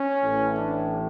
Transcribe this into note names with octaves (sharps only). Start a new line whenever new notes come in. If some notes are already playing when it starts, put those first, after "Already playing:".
Already playing: C#4
A1 A2
D4